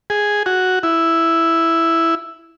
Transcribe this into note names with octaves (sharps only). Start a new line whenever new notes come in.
G#4
F#4
E4